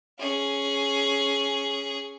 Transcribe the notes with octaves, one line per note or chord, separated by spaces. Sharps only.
C#4 G#4